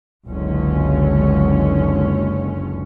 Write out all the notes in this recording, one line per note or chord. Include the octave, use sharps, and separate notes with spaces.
F#1 C#2 D3 C#4